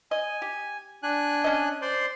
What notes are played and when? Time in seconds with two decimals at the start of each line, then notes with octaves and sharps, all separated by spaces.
0.11 D#5 G#5
0.42 G4
1.03 D4 G#5 F#6
1.44 C#4 D#5
1.82 C5 D5 C6